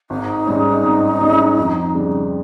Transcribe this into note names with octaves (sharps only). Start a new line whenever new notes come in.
G#1 D#4
G#2 G3 C#4
G#1
G#2 G3 C#4
F2
C#3 G3